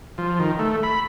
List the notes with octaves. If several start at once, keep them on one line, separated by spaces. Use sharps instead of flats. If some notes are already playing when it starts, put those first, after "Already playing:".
F3
D#3
A3
B5